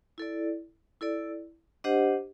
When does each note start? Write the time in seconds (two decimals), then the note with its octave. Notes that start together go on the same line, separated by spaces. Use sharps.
0.18 E4 A4 D5
1.01 E4 A4 D5
1.84 D4 G4 C5 D#5 F#5